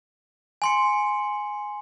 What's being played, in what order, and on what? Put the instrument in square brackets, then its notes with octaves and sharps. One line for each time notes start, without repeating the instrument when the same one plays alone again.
[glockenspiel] G#5 C6 C#7